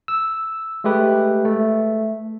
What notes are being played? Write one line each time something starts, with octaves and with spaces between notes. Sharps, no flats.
E6
G#3 A3 G4 B4
A3